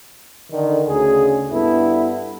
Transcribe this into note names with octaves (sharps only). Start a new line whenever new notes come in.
D3 D#3
D2 C#3 G#4
G2 B3 E4 A4